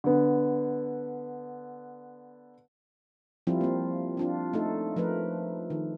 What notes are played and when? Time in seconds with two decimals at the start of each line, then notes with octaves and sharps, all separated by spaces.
0.04 D3 B3
3.47 F3 G3 C4 E4 F4
3.61 A#3 C4
4.17 C4 D4 F4
4.53 A3 D#4 A4
4.96 F3 A3 A#4 B4
5.70 D#3